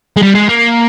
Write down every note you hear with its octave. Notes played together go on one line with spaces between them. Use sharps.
G#3
G3
G#3
A#3